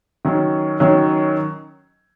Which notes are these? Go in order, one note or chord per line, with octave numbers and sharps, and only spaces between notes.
D#3 F#3 C#4
D#3 F#3 C#4